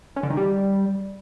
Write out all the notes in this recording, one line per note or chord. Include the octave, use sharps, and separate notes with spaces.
C#4
D3
D#3
G3